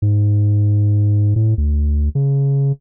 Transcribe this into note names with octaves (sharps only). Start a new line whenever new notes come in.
G#2
A2
D2
C#3